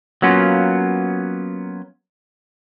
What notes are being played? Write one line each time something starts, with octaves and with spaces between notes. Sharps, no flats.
F#3 A#3 B3 C#4 F4